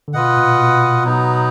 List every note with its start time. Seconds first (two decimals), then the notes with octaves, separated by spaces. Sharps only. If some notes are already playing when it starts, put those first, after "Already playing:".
0.08 D3
0.13 B2 F4 B4 D#5 F#5
0.37 A#2
0.59 B2
1.04 B2 F#3 B3 D#4